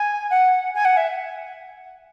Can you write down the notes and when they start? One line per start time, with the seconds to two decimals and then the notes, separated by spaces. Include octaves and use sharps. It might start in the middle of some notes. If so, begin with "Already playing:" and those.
Already playing: G#5
0.30 F#5
0.75 G#5
0.85 F#5
0.97 E5